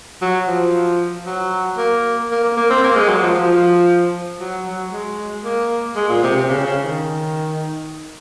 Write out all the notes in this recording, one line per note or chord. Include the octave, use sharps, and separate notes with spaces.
F#3
F3
F#3
A#3
A#3
A#3
A#3
C4
A#3
G#3
F#3
F3
F3
F#3
F#3
G#3
A#3
G#3
A#2
C3
C3
C#3
C#3
D#3